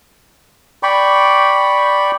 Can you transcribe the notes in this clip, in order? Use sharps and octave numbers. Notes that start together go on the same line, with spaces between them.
D5 G5 B5 C#6